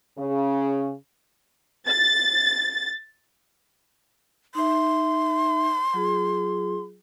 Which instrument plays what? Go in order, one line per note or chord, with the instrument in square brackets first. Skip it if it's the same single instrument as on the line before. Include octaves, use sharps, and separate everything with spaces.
[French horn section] C#3
[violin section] A6
[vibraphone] D#4 E5 [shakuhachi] C6
[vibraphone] F#3 F4 G#4